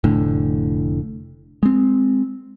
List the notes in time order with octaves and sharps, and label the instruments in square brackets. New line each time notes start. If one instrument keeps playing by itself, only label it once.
[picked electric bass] F1 A2 D3
G#3 C4